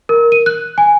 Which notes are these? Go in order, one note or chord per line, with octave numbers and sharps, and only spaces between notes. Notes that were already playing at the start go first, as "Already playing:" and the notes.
A#4
D#7
F#6
G#5